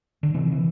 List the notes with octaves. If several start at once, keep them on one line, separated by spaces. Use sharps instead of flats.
D3
C3 E3
E3